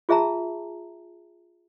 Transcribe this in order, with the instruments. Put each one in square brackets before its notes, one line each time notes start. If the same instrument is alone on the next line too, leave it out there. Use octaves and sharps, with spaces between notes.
[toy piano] F4 G#4 E5 A5 A#5